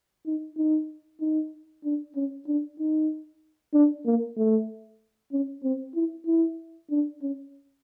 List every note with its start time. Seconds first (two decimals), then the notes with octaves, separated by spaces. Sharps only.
0.26 D#4
0.58 D#4
1.21 D#4
1.84 D4
2.16 C#4
2.47 D4
2.79 D#4
3.74 D4
4.06 A#3
4.37 A3
5.32 C#4
5.63 C4
5.95 E4
6.27 E4
6.90 D4
7.22 C#4